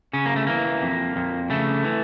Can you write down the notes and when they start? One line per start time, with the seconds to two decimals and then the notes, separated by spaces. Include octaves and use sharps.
0.13 C#3 C#4
0.26 A#3
0.36 A3
0.47 E3 A#3
0.82 F2
1.16 F2
1.50 C#3 A3
1.84 E3